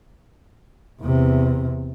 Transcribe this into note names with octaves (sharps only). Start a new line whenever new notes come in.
E2 C3